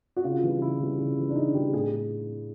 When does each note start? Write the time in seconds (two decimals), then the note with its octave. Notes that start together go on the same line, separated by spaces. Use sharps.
0.16 F#4
0.24 C#3 F4
0.43 E3 G3
0.61 C#3 E4
0.80 E3 G3
0.98 C#3
1.18 E3 G3
1.30 D4
1.35 C#3 D#4
1.54 E3 G3 G4
1.73 A2 G#4